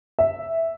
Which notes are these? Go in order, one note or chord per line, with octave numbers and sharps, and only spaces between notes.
E5